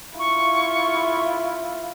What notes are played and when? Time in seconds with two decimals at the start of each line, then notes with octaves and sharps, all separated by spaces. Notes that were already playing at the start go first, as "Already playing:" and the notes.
0.19 E4 F4 C#6